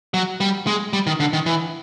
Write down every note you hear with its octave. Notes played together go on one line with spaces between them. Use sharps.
F#3
G3
G#3
G3
D#3
D3
D#3
E3